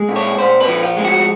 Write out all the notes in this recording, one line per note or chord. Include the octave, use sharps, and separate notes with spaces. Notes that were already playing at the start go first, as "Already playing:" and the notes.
Already playing: G#3
A#2
C#5
A#2 C5
B4
F3
F4
G#3
F#4